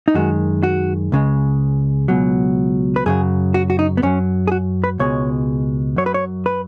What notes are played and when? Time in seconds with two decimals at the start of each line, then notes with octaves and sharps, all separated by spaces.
0.08 D#4
0.14 F#2 D#3 G#3 F#4
0.63 F#4
1.12 C#2 C#3 G#3
2.08 C#2 B2 F#3
2.96 B4
3.06 F#2 C#3 F#3 G#4
3.54 F#4
3.70 F#4
3.79 D#4
3.97 B3
4.02 F#2 F#3 C#4
4.47 G#4
4.52 F#4
4.84 B4
4.99 C#2 B2 G#3 C#5
5.96 F#2 F#3 C#5
6.06 B4
6.14 C#5
6.46 B4